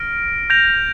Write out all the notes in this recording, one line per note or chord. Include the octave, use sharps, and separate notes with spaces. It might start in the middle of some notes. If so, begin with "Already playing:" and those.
Already playing: F6 A#6 D7
G6 A#6 F7